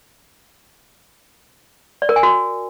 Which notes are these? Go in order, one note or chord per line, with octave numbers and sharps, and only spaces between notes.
D5
A#4
G#5
F#4